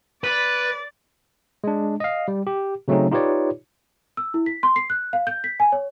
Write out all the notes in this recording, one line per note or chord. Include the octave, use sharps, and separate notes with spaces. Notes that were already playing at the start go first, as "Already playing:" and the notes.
B4 D5
G#3 D4
D#5 F5
G3
G4
C#3 F#3 A3 C4 C#4 D#4
D#4 F4 G4 B4 C#5 D5
E6
E4
B6
C6
C7
F#6
F5
G6
B6
G#5
C#5